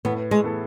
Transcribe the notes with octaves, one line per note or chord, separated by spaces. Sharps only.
A2 B3
G#3
E3 B3 E4 A4